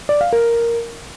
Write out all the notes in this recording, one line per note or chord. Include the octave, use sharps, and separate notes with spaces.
D5
F5
A#4